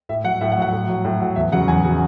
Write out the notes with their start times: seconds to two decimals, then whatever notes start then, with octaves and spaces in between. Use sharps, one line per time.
0.09 A2 E5
0.24 F#3 F#5
0.41 A2 E5
0.52 F#5
0.57 F#3
0.62 F#5
0.72 A2
0.88 F#3
1.05 A2
1.20 F#3
1.36 E2 E5
1.52 C#3 F#3 F#5
1.68 E2 G#5
1.83 C#3 F#3